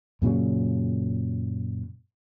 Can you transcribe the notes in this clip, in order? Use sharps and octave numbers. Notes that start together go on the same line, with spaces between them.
F#2 A#2 C#3 F#3